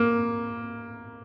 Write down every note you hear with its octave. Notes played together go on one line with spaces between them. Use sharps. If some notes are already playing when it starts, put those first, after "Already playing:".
Already playing: A#3